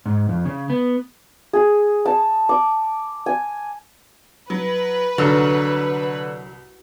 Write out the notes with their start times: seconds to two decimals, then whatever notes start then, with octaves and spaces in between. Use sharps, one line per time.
0.06 G#2
0.29 F2
0.45 C#3
0.70 B3
1.53 G#4
2.06 A5
2.49 D6
3.26 G#5
4.50 F#3 B4
5.18 C2 D3 F#3 F6 A6